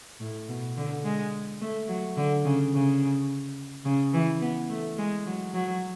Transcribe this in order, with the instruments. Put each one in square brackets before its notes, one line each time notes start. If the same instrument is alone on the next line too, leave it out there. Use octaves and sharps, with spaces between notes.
[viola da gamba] A2
B2
D3
G#3
A3
F#3
D3
C#3
C#3
C#3
E3
B3
A3
G#3
F#3
F#3